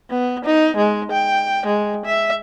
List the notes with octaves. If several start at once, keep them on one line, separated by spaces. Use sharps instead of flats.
B3
D#4
G#3
G5
G#3
E5